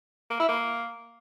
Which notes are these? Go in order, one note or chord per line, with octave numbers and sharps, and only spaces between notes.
A#3
E4
A#3